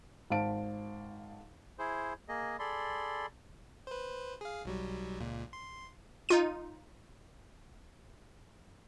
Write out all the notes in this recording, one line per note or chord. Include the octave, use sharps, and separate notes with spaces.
G#1 C5 F5 A5 D7
E4 G#4 C5
A#3 G#4 D#5
G#4 A4 D5 B5 C6
B4 C5
G#4 F5
B1 F#3 G3
C#2 A#2
C6
D#4 F4 D#7